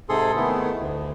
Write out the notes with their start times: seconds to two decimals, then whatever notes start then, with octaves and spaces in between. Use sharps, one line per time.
0.09 G#2 C3 G#4 A4 C6
0.36 D#3 A3 B3 E4
0.80 D2